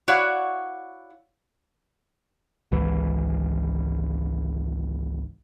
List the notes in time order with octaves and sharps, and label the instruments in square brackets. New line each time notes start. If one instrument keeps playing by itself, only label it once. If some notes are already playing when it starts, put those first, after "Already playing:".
[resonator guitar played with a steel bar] E4 F#4 C#5 D5 F5 F#5
[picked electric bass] G#1 C#2 E3